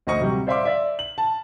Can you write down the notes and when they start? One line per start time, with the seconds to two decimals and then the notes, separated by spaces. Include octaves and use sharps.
0.07 D2 C5 D#5 C#6
0.21 C3 F#3 G3
0.47 C5 D5 E5 F5 C6 D6
0.65 D5 E5
0.99 F#7
1.18 A5